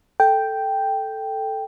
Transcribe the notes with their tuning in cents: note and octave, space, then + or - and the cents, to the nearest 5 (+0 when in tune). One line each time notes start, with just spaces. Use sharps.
A4 +0 G5 +0